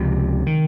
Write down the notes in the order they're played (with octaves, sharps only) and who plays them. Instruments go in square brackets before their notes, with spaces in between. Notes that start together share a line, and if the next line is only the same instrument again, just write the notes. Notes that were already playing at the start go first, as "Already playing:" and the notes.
Already playing: [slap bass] C#2 C3 F3
D#3